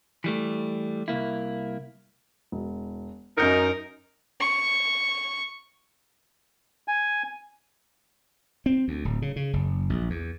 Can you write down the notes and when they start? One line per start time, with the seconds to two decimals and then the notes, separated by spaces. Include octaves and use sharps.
0.24 E3 G3 A3
1.08 C2 F2 A#3 E4
2.52 E1
3.38 F#2 D#4 A#4 G6 C#7
4.40 C#6
6.88 G#5
8.66 C4
8.88 D2
9.05 D1
9.22 C#3
9.36 C#3
9.53 F#1
9.90 A#1
10.10 E2